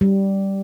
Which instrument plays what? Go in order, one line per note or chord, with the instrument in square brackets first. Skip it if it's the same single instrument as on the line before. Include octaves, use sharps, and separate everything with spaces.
[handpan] G3